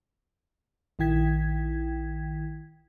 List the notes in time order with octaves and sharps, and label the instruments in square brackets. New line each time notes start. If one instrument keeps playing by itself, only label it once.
[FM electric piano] A#1 D#3 E4 G5 G#6 B6